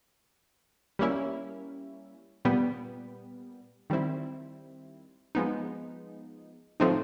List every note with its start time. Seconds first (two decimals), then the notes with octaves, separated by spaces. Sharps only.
0.99 G3 A#3 C#4 E4
2.45 A#2 G3 B3
3.90 D#3 G3 C4 E4
5.35 F3 G#3 B3 D#4
6.80 A2 F3 A3 C4 D#4